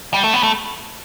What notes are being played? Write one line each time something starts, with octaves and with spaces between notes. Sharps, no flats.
G3
A3
B3
A3